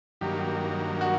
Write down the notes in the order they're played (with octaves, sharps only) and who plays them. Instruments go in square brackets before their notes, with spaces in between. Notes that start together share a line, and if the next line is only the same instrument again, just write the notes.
[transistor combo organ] G2 D#3 F#3 A#3 [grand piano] G4
[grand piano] F#4